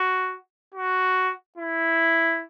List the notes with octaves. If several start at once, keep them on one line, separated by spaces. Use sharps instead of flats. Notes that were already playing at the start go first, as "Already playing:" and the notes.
Already playing: F#4
F#4
E4